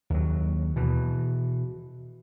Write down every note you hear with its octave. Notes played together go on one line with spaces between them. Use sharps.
D#2 F#3
B2 E3